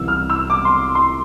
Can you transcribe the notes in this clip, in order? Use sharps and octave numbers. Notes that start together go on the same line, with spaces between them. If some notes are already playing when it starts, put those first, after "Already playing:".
Already playing: C2 C3 E3 E6
F6
E6
D6
C6
C6